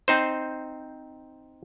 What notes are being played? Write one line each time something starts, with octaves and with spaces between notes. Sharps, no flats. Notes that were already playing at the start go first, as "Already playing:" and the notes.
C4 D#4 C5